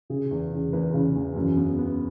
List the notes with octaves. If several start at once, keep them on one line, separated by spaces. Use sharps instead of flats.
C#3 G#4
E2
C#3
E2 B4
C#3
E2
F#2
B3
B3